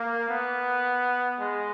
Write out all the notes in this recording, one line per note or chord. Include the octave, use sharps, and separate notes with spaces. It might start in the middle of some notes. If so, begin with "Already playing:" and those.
Already playing: A#3
B3
G#3